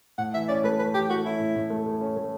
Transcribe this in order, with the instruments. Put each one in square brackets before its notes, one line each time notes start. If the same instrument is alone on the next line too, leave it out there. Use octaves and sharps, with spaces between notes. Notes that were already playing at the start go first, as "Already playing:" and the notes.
[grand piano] A2 [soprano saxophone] F#5
[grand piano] E3 [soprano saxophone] E5
[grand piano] C#4 [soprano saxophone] D5
[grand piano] A3 [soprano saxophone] B4
[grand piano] C#4 [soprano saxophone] B4
[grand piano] E3 [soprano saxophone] G4
[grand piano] A3 [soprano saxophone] F#4
[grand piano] C#4 [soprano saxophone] E4
[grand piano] A2
A2
A3
A3
C#4
A3